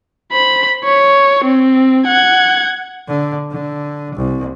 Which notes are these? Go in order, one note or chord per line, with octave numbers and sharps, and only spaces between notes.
C5 B5
C#5
C4
F#5 G#6
D3
D3
C2